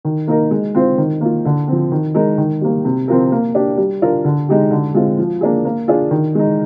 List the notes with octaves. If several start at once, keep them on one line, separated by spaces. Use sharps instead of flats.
D#3
A#3 D#4 A#4
G#3
C4 F4 C5
D#3
A#3 F4
D3
F3 C4
D#3
G#3 D#4 A#4
D#3
G3 A#3
C3
F3 C4 F4 A#4
A#3
D4 G4
G3
D4 F4 A#4
D3
G#3 D#4 G4
D3
G#3 C4 F4
F3
A#3 D4 G#4
A#3
D4 F4 G#4
D#3
G#3 D#4